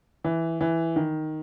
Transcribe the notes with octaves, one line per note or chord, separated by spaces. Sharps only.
E3
E3
D#3